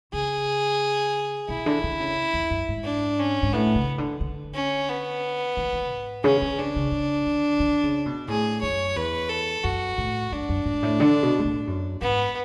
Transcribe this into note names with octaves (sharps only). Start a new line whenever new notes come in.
C#3 G#4
B2 E4
D3
D3
C#3
E2
F#2
G#2
D4
C#4
G#2
A2 B3
C#3
D3
D3
C#4
B3
E3
E3
G#2
C#3 C#4
D3
C#3 D4
C#3
C#3
D3
D3
C#3
B2
A2 G#4
F#2 C#5
E2 B4
A4
F#2 F#4
A2
F#2 D4
F#2
G#2
A2
D3
B2
G#2
A2
F#2
G#2 B3